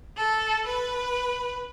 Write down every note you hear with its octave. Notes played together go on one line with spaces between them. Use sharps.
A4
B4